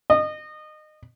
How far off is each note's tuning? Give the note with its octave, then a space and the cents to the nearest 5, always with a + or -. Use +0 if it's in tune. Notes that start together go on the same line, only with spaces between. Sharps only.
D#5 -25